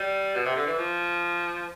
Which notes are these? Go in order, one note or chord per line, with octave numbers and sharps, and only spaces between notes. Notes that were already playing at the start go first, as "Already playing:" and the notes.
Already playing: G3
B2
C3
D3
E3
F3